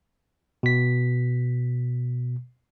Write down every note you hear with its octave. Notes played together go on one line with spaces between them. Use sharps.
B2 B6